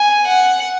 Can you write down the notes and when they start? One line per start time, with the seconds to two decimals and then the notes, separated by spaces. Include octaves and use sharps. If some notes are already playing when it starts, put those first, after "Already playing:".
Already playing: G#5
0.28 F#5